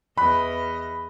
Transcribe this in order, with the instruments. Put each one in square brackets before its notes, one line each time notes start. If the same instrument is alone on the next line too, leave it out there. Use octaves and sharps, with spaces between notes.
[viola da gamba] E2 D#5 [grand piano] B5 F#6